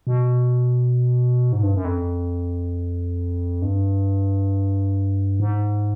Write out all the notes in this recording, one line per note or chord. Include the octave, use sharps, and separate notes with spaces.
B2
G#2
G2
F#2
F2
G2
G#2